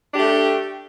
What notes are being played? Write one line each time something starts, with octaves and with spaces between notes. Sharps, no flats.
A3 D4 G4